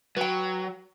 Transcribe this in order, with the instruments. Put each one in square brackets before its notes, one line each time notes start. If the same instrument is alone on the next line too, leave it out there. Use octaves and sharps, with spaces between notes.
[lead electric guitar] F#3 [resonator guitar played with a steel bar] B4 G5